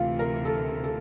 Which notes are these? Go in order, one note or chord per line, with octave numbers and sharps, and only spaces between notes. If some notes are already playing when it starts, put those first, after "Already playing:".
Already playing: D2 C3 E3 F4
A#4
A4
A4